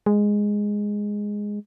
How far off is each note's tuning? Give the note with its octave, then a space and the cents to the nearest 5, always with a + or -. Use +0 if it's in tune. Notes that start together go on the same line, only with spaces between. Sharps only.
G#3 -5